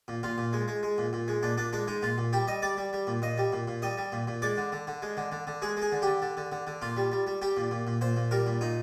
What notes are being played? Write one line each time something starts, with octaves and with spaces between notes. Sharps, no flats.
A#2
A#2 F4
A#2
G#3
G#3
G#3
A#2
A#2
G#3
A#2 D4
A#2 D4
G#3 D4
G#3 D#4
A#2 F4
A#2
G3 G4
G3 D#5
G3 D5
G3
G3
A#2
A#2 D#5
G3
A#2
A#2
G3 D#5
G3
A#2
A#2
G#3 D5
D3
D3
D3
G#3
D3
D3
D3
G#3 G#4
G#3 G#4
D3
D3 G4
D3
D3
D3
D3
A#2 F4
G3
G3
G3
G3 G4
A#2
A#2
A#2
A#2 C5
A#2
G3 A#4
A#2
A#2 D#4